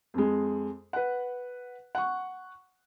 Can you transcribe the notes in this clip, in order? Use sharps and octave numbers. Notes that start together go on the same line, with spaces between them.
F2 G#3
B4 F#5
F#5 C#6